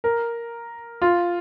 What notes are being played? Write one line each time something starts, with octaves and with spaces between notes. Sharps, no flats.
A#4
F4